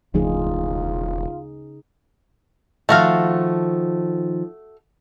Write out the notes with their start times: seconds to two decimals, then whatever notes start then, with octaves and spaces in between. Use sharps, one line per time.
0.14 E1 D2 C#3 F3 A3 D#4 F4 G#4
2.89 D#3 F3 A3 F#4 F5